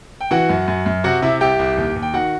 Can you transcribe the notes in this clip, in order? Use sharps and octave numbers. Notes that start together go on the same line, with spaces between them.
G5
E3 F#4 F#5
F#2
F#2
F#2
C3 F#4 F#5
C3 E4 E5
C2 G4 G5
C2
D#2
D#2
G5
D#3 F#4 F#5